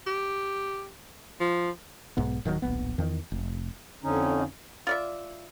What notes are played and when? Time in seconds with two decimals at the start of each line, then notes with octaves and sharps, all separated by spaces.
0.06 G4
1.40 F3
2.17 B1 G#2 B3
2.45 D1 D#3 F3 F#3
2.62 D1 A#1 B3
2.98 E2 D#3
3.32 F1
4.04 F2 D3 C#4 D#4
4.87 F4 D5 E5